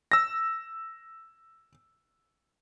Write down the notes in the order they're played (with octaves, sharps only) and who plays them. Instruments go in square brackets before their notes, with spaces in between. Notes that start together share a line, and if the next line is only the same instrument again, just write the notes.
[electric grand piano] E6 A#6